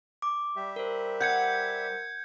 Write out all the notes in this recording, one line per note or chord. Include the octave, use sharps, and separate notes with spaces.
D6
G3 G4 E5
A#4 C5
F#5 G6 G#6 C#7